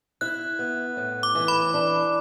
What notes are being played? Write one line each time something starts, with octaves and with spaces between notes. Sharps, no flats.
E4 F#6
B3
A2
D6
E3
B5
D4